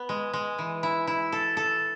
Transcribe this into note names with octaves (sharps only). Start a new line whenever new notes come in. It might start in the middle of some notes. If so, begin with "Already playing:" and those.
Already playing: B3
G#3
G#3
E3
E4
E4
A4
A4